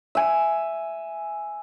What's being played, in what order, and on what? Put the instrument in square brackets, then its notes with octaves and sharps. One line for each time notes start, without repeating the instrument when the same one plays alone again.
[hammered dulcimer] E5 G#5